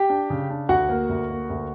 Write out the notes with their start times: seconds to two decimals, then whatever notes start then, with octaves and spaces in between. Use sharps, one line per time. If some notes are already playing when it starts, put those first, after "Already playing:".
Already playing: G4 G5
0.10 D4
0.30 C#3
0.50 D4
0.69 D2 F#4 F#5
0.89 A#3
1.09 D2
1.30 A#3
1.50 D2